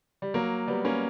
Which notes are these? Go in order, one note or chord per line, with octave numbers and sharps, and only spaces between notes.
G3
F#3 A#3
G3 B3
A#3 C#4